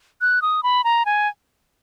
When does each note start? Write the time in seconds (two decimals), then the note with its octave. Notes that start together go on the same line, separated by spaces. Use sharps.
0.21 F#6
0.42 D#6
0.63 B5
0.84 A#5
1.06 G#5